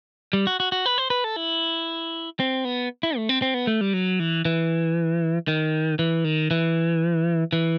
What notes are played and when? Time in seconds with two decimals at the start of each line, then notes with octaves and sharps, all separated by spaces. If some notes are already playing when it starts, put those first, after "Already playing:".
0.33 G3
0.47 F#4
0.60 F#4
0.72 F#4
0.86 B4
0.98 C5
1.10 B4
1.24 A4
1.36 E4
2.40 C4
2.65 B3
3.03 E4
3.17 A3
3.29 C4
3.42 C4
3.54 B3
3.67 A3
3.81 G3
3.93 F#3
4.20 E3
4.45 E3
5.48 D#3
5.99 E3
6.24 D#3
6.51 E3
7.53 E3